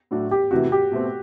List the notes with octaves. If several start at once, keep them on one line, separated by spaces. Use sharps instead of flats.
A2 F#3 A3 D4 F#4
G4
E2 C3 E3 A3 F#4
G4
B2 A3 C4